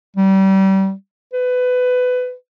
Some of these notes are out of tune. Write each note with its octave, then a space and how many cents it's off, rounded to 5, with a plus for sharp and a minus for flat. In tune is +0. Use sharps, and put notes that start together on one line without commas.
G3 -30
B4 +20